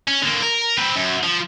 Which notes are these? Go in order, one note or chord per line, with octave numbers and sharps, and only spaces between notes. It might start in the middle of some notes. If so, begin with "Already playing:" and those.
C#4
D3 A#3
A#4
C4 B4
F#2
F3